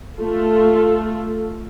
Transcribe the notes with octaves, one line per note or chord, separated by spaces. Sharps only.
A3 F4 A4